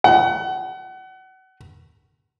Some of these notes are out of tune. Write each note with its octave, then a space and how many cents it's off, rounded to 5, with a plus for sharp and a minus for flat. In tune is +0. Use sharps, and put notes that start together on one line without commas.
F#5 +30